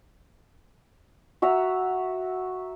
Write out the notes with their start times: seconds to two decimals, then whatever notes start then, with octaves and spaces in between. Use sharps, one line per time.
1.42 F#4 E5 A#5